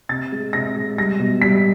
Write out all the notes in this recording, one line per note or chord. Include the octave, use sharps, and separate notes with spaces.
C3 A6
G#3
C3 A#6
G#3
G3 A#6
B2
G3 B6